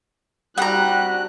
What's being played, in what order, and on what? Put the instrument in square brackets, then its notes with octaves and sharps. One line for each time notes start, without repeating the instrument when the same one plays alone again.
[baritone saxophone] G3 [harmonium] C4 D4 F#4 [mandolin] F#5 A#5 [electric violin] F#6